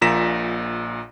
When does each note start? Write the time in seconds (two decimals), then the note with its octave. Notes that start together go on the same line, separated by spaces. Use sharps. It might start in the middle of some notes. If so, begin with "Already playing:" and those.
0.01 A#1 A#2 A#5 A#6 B6 E7